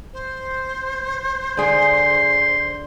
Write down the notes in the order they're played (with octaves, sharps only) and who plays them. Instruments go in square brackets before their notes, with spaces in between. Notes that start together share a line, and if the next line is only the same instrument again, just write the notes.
[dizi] C5
[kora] D3 G#4 [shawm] C6